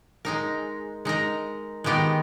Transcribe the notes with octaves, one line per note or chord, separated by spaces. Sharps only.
G#3 D#4 A#4
G#3 D#4 A#4
D#3 G#3 B3 G4 A#4